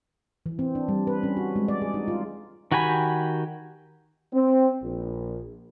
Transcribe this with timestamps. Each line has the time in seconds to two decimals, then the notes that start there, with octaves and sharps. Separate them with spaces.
0.46 E3
0.59 C4
0.75 D4
0.88 G3
1.07 B4
1.23 C#4
1.37 F#4
1.56 G#3
1.68 D5
1.82 G#4
1.94 D#4
2.08 F4
2.72 D#3 F#4 G4 G#5 B5
4.32 C4
4.82 A#1